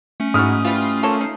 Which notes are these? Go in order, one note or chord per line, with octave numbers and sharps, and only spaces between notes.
A3 C#4 C#7
G#2 E4 F#4 D#6 F6
E3 G3 F4
A#3 A4 C#5
D#4 C7